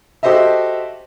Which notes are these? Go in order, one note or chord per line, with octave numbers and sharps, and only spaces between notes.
F#4 G4 A4 C5 D#5 E5